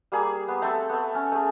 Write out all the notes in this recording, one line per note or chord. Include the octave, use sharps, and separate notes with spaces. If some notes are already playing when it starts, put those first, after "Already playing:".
G3 A#3 G#4
B3
A3 C4 A4
A3 B3
C#4
A3 G#4